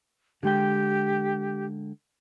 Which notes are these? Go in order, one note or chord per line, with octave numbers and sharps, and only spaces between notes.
D3 G#3 G4 G5